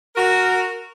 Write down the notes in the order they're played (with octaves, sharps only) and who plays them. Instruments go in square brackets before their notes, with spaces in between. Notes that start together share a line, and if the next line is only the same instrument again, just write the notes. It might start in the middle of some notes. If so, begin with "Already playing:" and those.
[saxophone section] F#4 A#4